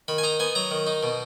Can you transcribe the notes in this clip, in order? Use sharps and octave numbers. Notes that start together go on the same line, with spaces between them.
D#3 B5
G#5
D#4 A#5
B3 G#5
F#3 A#5
D#3
D#4
B2